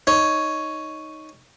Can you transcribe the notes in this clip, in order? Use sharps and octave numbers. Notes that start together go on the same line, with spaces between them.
D#4 C#5